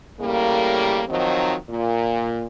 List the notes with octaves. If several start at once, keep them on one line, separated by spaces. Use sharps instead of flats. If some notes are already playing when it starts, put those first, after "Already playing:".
A2 C#3 G3 A#3
D#3 F3 F#3 C4 D#4
A#2